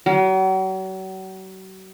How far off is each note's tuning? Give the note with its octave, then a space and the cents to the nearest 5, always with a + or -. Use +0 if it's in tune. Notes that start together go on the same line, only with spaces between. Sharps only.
F#3 +40